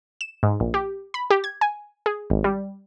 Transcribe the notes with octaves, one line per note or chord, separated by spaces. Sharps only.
E7
G#2
A#1
G4
B5
G4
G#6
G#5
G#4
G#1
G3